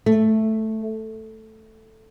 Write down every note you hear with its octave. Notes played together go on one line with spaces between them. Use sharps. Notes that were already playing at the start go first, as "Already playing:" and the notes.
A3